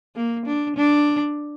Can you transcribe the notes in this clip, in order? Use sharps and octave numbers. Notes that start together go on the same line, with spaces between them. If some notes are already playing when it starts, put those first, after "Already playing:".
A#3
D4
D4